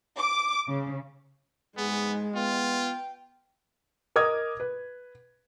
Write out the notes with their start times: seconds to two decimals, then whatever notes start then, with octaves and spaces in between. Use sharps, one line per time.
0.17 D6
0.68 C#3
1.77 G#2 G#3 B3 G#4
2.35 B3 F4 G5
4.16 A#4 D#5 D6 D#6 F6 G#6
4.60 B4